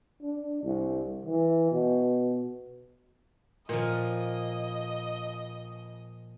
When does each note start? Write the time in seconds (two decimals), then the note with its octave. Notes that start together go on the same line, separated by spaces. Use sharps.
0.22 D4
0.64 C2
1.25 E3
1.71 B2
3.69 A#2 F3 D#5